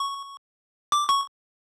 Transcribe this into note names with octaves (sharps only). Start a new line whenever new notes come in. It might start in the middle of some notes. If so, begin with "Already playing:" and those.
Already playing: C#6
D6
C#6